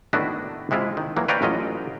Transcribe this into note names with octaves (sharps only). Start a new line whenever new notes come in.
A2 D#3 B3 D4 E4 F#4
C3 G#3 E4 F4
D#3
E3 F#3 A#3
B4 C#5 D5 F5 G5 A#5
A1 F#3 C#4 F4 D#5